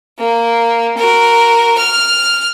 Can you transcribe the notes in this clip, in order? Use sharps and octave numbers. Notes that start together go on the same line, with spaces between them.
A#3
F#4 A#4
F6